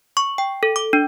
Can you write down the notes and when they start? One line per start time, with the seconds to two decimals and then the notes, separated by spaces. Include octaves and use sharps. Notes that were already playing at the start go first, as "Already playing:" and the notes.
0.17 C#6
0.38 G5
0.63 A4
0.76 D6
0.93 D4